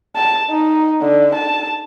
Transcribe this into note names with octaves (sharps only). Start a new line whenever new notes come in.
A5
D#4
D3
A5